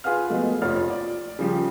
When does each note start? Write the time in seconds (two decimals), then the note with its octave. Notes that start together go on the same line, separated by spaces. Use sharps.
0.04 F4 G#4 B4 F5 F6
0.30 B2 F3 G#3 A3 B3
0.62 F1 F2 F3 C#5 F6 A6
0.90 D5
1.39 C#3 F3 G3